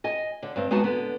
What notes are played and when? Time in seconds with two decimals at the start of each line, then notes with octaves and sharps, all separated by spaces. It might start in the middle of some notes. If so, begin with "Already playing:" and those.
0.04 D#5 G#5
0.43 D3
0.56 G2 C4
0.71 G#3 B3 D#4 F#4 A5
0.84 D3 B3